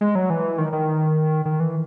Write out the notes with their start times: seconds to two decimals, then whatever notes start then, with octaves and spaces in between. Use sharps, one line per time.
0.01 G#3
0.15 F#3
0.30 E3
0.58 D#3
0.73 D#3
1.45 D#3
1.60 E3